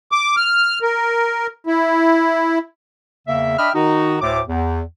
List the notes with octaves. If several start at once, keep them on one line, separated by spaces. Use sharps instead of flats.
D6
F6
A#4
E4
E2 C#3 A#3 E5
D4 D#5 E5 G5 B5 F6
D#3 D#4 F#4
D2 A2 A3 C5 D6
E2